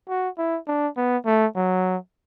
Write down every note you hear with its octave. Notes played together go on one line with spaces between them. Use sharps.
F#4
E4
D4
B3
A3
F#3